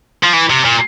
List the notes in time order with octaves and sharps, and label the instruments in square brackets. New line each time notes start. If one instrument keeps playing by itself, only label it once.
[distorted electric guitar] F3
E3
C3
A#2